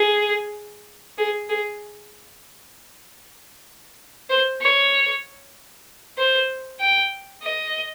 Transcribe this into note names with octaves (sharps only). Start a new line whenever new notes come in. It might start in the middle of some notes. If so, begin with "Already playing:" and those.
Already playing: G#4
G#4
G#4
C5
C#5
C5
G5
D#5